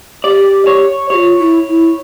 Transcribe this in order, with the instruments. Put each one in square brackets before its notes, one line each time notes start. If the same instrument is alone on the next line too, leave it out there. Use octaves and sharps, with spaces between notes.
[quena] G4 [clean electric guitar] D5
[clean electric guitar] C#5
[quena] G4 [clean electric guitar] C#5
[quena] F4
E4
E4